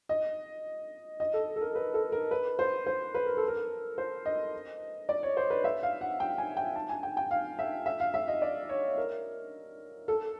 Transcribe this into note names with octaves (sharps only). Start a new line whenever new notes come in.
D#5
D#5
A4
A4
A#4
B4
A4
A#4
B4
C5
C5
B4
A#4
A4
A#4
C5
D#5
D5
C#5
C5
B4
E5
F5
F#5
G5
G#5
G5
A5
G#5
G5
G5
F5
E5
E5
F5
E5
D#5
D5
C#5
A#4
A4